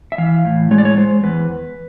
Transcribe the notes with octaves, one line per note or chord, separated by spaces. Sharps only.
E5
E3 F5
A2
G#3 C#5
D5
C#5
G#3 C5
E2 B4